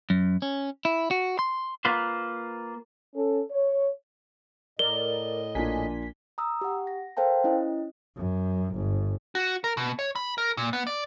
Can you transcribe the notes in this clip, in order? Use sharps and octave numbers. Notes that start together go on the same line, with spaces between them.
F#2
C#4
E4
F#4
C6
A#3 F4 B4 C5
C#4 A4
C#5
A2 A#4 D5 D#5 G7
A#1 A#3 D4 F4 G#5 B6
A#5 D#6 E6
G4 F#5
A#6
A4 A#4 C5 F5 G5 A5
C#4 E4 D#5
F#2
G1
F#4
A#4
B2
C#5
B5
A#4
A#2
B3
D5